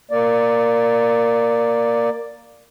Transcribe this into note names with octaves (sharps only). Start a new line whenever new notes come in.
A#3 D5